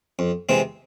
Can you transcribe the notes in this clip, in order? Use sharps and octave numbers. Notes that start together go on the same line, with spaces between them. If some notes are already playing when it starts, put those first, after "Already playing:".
F2
C3 E3 G#3 C4